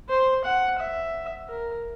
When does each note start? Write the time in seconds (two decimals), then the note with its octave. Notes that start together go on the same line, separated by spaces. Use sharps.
0.09 C5
0.44 F#5
0.79 E5
1.48 A#4